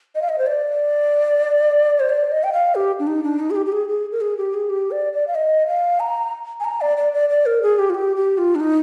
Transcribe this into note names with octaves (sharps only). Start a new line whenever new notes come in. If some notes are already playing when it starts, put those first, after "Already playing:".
D#5
F5
D#5
C5
D5
C5
D5
D#5
G5
F5
G4
D4
D#4
D4
D#4
G#4
G4
G4
G#4
G#4
A#4
G#4
G4
G#4
G4
D5
D5
F5
D#5
F5
A#5
G#5
A#5
D5
D5
D5
D5
A#4
G#4
G4
F4
G4
G4
F4
D4
D#4